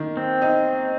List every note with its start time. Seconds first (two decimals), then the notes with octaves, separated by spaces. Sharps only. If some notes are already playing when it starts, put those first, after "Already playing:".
Already playing: D#3 A#3
0.17 C4
0.42 D#4